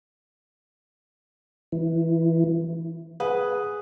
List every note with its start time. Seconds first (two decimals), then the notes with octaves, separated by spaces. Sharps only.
1.72 E3
3.20 G#4 B4 F#5 D#6